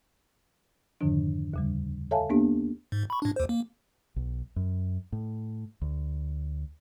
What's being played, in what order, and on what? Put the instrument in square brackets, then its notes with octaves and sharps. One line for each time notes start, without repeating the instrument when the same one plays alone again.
[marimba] F2 G#2 D3 D#3 F3 D4
D#2 C#3 G3
A4 C#5 E5 F5 G#5 A5
A#3 B3 D4 G4
[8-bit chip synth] G#2
B5 C#6
A2 D4
D#2 C5
A#3
[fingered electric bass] B1
F#2
A2
D2